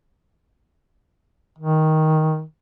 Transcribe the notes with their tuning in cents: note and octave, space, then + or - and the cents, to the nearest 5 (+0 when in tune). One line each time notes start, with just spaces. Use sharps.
D#3 +10